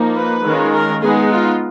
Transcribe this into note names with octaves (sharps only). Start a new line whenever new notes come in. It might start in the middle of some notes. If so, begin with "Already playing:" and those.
Already playing: F3 A#3 D#4
B4
D#3 G#3 C#4 F4
A#4
G#3 B3 D#4 G#4
F4